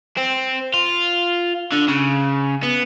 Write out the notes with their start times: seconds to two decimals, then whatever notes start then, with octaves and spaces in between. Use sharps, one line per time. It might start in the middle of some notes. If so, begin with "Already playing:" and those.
0.18 C4
0.74 F4
1.72 D3
1.88 C#3
2.63 B3